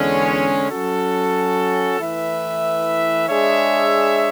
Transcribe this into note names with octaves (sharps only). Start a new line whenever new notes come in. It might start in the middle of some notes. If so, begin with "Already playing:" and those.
Already playing: E2 D3 G#3 C#4
F#3 C#4 F#4 A4
E3 A3 E4 B4 E5
G#3 D4 G#4 C#5 E5